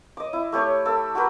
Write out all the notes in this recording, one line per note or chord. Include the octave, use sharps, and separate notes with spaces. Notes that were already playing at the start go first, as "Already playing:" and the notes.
D#5 D6
E4
A3 G4 C#5
A4 D6 E6
F#4 G4 A#4 B4